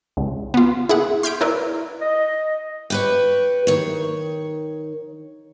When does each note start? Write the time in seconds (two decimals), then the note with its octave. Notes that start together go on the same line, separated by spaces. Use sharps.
0.17 C#2
0.54 B3 F4
0.89 E4 G#4 F#5
1.23 C6 F6 G6 G#6 B6 D7
1.41 E4 A#4 B4 D5
2.00 D#5
2.90 G4 B4 C#5
3.67 D#3 C#5